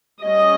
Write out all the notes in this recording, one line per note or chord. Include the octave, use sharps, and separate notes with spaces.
G3 C#4 D#5